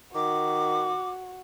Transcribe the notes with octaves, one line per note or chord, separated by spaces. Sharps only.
D#3 F#4 D6